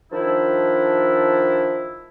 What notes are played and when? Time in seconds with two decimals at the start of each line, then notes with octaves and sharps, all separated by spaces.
0.12 D#3 F3 D4 E4